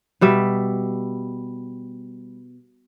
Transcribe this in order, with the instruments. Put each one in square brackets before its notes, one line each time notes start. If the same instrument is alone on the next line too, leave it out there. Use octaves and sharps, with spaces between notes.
[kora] B2 G3 E5